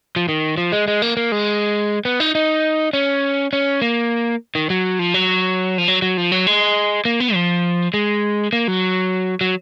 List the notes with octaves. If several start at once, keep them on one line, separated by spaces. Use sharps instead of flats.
F3
D#3
F3
G#3
G#3
A#3
A#3
G#3
B3
D#4
D#4
C#4
C#4
A#3
D#3
F#3
F3
F#3
F3
F#3
F#3
F3
F#3
G#3
A#3
B3
F3
G#3
A#3
F#3
F#3